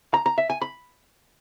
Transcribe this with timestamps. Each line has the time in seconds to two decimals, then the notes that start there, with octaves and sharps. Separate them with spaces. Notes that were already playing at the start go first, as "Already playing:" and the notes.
0.14 A#5
0.26 A#5
0.38 E5
0.50 G#5
0.62 B5